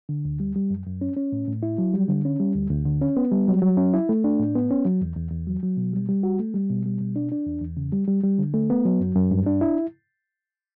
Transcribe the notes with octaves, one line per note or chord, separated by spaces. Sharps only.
D3
D2
G3
G3
F#2
F#2
C#4
C#4
A2
A2
E4
F#3
G3
D3
C#4
G3
D2
D2
D3
C#4
B3
G3
F#3
F#3
C#4
E4
A3
D4
A2
B3
C#4
F#3
E2
E2
E2
F#3
F#3
B2
G3
G3
F#4
A3
G3
B2
G3
B2
D4
D4
E2
E2
C#3
G3
G3
G3
D3
A3
B3
F#3
F#2
F#2
G2
D4
E4